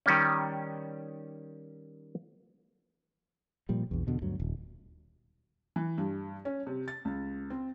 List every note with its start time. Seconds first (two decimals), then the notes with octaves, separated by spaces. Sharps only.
0.06 D#3 G3 C#4
3.69 A#2 F3 G3
3.91 A#1 E2
4.07 E2 B2 D3
4.22 D2 G2 F#3
4.40 D#1
5.76 E3
5.98 G2
6.45 C#4
6.67 C3
6.88 A6
7.05 C#2
7.50 C4